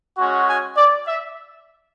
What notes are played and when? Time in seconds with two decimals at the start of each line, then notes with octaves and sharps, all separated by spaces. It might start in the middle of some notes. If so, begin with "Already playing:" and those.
0.18 G#3 C#4 F#4
0.47 G#5
0.77 D5
1.07 E5